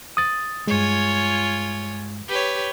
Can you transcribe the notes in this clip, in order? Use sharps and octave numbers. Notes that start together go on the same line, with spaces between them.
D#6 A6
G2 G#3 F4 C#5 G#5
G4 B4 C#5